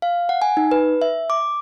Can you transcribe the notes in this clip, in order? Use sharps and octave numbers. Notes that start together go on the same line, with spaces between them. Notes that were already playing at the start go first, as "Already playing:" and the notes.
F5
F#5
G#5
D#4
B4
E5
D6